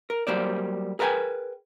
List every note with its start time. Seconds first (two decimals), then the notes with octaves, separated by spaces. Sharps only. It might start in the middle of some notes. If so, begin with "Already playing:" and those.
0.10 A#4
0.27 F#3 G3 A#3 C5 D5
0.99 G#4 A#4 B4 D#5 G5 G#5